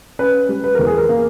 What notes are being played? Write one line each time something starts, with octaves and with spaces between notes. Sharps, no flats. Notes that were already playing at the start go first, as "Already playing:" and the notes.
C#4 B4
G3
B4
E2 A#4
G#4
A#4
A#3